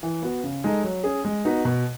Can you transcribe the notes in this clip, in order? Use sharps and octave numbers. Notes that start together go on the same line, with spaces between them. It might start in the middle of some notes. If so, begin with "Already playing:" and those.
E3
B3 F#4
C#3
G#3 D#4 A4 D#5
F#3
C#4 G#4
G#3
B3 D#4 F#4 B4
B2